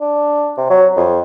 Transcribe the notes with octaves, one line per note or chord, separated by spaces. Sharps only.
D4
C3
F#3
F2